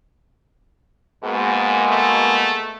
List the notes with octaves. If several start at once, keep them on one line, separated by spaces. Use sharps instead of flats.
G#2 B2 G#3 A#3
A3